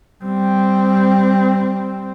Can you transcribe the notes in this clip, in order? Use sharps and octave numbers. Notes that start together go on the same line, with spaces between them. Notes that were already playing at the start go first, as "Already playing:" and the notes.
G3 C4